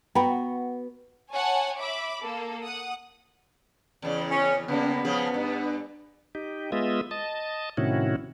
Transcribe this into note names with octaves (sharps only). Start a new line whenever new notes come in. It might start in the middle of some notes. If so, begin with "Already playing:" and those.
B3 F#4 G5 A#5 B5
C#5 F#5 G#5 A5
E5 B5 D6
A#3 A4
F#5 D#6
E2 C#3
C#4
C#3 G3 A#3 B3
C#3 F3 G#4
G2
D#4 G4
G#3 B3 F4 D#5 E5
D#5 A5
A2 C3 D#3 C#4 E4 F#4